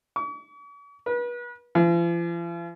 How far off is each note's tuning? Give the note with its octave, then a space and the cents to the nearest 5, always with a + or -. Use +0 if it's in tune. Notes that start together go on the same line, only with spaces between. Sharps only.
C#6 +45
B4 -35
F3 -45